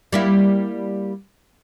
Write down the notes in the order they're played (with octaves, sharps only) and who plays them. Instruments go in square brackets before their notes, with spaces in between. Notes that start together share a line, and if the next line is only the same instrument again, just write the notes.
[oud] G3 A#3 E4